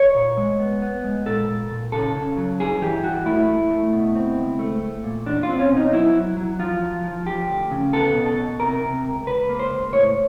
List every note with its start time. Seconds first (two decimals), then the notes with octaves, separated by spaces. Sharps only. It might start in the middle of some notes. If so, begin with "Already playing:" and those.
Already playing: C#5
0.15 A#2
0.37 G#3
0.59 B3
0.82 B3
1.04 G#3
1.26 A#2 A4
1.49 A#2
1.71 A#2
1.92 C#3 A4
2.15 C#3
2.37 F#3
2.60 G2 G#4
2.82 E3 G4
3.03 G2 F#4
3.26 A3 E4
3.48 A3
3.71 A3
3.93 B2
4.16 C4
4.37 C#2
4.59 A3
4.82 A3
5.04 A#2
5.26 E2 D4
5.43 F4
5.49 C4
5.59 C#4
5.71 B2
5.77 D#4
5.93 F#3 E4
6.15 F#3
6.37 F#3
6.59 F3 F4
6.82 F3
7.04 F3
7.26 F3 G4
7.49 D2
7.71 C#3
7.93 B3 A4
8.15 B2
8.26 A4
8.37 B2
8.60 C3 A#4
8.82 C3
9.05 C#2
9.27 C#2 B4
9.49 A#3
9.59 C5
9.71 C#2
9.93 A2 C#5